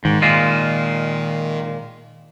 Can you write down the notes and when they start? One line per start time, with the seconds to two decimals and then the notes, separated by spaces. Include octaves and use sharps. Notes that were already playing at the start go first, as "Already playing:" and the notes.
0.05 G#2 D#3
0.22 A#2 G#3 F4